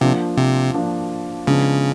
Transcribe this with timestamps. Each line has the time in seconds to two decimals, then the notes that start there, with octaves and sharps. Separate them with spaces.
0.01 C3 F3 A#3 D4
0.37 C3
0.74 F3 A#3 D4
1.47 C#3 F3 G#3 B3 D4